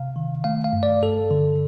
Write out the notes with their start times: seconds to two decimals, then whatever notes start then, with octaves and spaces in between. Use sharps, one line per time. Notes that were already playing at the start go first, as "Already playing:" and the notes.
Already playing: C3 F5
0.16 D#3
0.44 A3 F5
0.64 F5
0.73 G2
0.83 D5
1.02 G2 A4
1.31 D3